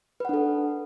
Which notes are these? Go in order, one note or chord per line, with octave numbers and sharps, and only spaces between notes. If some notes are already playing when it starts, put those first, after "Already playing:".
D4 A4 B4 F#5